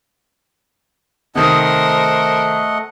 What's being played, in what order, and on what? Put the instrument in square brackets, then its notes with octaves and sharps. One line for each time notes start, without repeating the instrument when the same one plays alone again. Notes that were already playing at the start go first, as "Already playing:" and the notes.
[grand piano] C3 D#3 D#6 [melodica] A3 D#5 F#5 [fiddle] A#4 C5